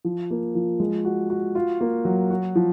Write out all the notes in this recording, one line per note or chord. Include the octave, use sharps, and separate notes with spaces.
F3
A#3
F3
G#3
F#4
F#4
F4
A#3
F#3
F#4
F3